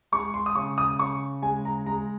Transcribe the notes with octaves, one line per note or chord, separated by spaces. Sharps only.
G#3 C#6
C6
D#6
C#3 C#6
D#6
C#3 C#6
G#3 G#5
A#5
G#3 A#5